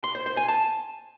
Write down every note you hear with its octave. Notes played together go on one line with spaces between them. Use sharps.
C6
C5
C5
G#5
A5